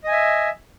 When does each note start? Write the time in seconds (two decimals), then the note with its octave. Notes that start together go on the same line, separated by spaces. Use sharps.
0.04 D#5
0.08 G#5
0.11 E5